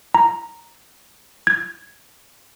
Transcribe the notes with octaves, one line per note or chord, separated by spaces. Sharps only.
A#5
G#6